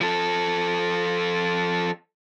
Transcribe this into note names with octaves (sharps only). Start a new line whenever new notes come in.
F3 A4